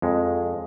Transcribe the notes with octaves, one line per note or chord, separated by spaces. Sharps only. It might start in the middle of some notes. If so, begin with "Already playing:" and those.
F2 G#3